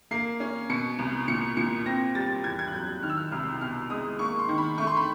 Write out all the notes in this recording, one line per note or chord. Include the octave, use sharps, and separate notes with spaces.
A#3 C7
C#4
B2 C#7
C2
A#2 C#7
A#2 C#7
C4 A#6
G3 A6
E2 G#6
G#6
F#6
F#3 G6
F#6
D#3 F6
E6
F6
C2 F6
B2 F6
G#3 D#6
A#3 C#6
C6
D#3
B5
A3 C#6
C6
B5